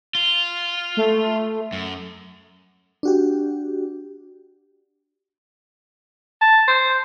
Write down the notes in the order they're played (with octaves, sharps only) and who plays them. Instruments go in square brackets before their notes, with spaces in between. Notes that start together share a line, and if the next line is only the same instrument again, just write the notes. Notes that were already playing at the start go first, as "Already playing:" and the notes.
[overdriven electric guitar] F4
[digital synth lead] A3
[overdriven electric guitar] F#2
[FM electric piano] D4 F#4 G4
[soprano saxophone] A5
C5